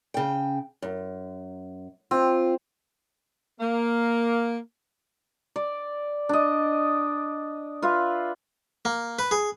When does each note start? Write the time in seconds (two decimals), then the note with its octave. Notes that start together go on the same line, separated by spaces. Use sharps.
0.14 C#3 G5
0.82 F#2
2.11 C4 F4
3.60 A#3
5.56 D5
6.29 D4 D#5
7.82 F4 B4 E5
8.85 A#3
9.19 B4
9.31 G#4